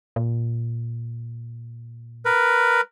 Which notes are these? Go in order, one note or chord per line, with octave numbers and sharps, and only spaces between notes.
A#2
A#4 B4